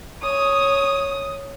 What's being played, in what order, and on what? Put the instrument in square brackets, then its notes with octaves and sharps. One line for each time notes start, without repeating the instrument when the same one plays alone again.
[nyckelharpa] C#5 [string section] D#6